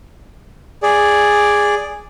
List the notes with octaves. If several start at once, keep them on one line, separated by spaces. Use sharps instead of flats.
G#4 D5